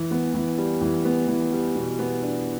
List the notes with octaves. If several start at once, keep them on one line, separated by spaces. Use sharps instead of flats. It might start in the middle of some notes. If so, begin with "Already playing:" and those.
Already playing: E3
B3
E3
G3
E3
B3
E3
G3
B2
B3
D4